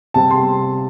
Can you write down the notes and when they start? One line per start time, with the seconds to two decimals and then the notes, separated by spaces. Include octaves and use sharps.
0.14 C3 G3 A5
0.31 C6